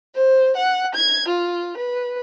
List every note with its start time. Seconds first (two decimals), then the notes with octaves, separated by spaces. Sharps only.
0.14 C5
0.54 F#5
0.92 G#6
1.26 F4
1.75 B4